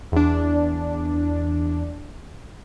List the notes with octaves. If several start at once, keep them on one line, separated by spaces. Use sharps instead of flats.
E2 D4